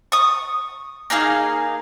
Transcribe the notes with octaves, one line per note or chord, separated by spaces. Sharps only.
C#6 D#6
A#3 D#4 G#4 F5